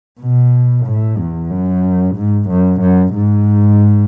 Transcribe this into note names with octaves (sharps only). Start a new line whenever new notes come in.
B2
A2
E2
F#2
G#2
F#2
F#2
G#2